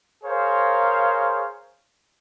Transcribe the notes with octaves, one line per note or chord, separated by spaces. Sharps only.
G#4 A#4 C5 C#5 F5